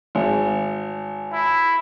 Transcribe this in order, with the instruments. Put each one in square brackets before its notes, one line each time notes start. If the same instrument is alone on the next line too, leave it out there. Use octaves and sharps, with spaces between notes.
[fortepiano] G#1
[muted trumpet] E4